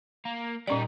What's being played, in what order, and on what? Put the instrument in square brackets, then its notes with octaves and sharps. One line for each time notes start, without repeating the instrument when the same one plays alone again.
[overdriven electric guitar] A#3
[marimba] A#2 C#4 D5 [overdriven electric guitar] G3 D#4